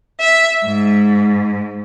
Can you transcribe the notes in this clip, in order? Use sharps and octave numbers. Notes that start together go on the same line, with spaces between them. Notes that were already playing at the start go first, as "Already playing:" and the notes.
E5
G#2